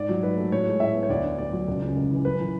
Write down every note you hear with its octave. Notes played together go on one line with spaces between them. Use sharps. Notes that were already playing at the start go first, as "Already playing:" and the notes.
Already playing: G#2 D5
F#3
G#2 B4
A3
A2 C#5
G#3
A2 E5
B3
C#5
D2 D5
D3
D2 D5
F#3
C#2
C#3
C#2
E3
F#2 B4
E3